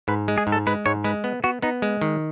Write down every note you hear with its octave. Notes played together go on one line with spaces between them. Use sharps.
G#2 B4
G#3
G#4
G#2
A4
G#3 B4
G#2 C#5
G#3 B4
B3
B3 F#4
B3 D#4
G#3
D#3